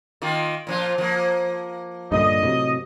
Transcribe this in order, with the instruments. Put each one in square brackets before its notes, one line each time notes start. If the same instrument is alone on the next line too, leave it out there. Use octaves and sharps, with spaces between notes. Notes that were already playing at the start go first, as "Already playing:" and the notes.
[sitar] D#3 A#3 F4
A#2 F3 F4
F3 A#3
[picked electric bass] G2 A#2 D3 [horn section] D#5
[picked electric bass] A2 C3 F#3